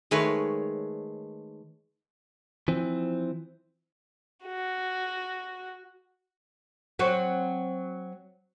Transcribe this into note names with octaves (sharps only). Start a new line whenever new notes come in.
D#3 G#3 A3 B4 C#5
E3 F3 C4
F#4
F#3 C4 F#4